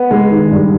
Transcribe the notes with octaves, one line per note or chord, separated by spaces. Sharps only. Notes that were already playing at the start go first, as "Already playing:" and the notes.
Already playing: B3
G#3
D#3
G2